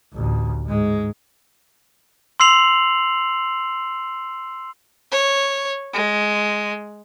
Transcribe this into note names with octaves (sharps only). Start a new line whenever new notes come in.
A1 D2
G#2 G#3
C6 E6 C7 F7 F#7
C#5
G#3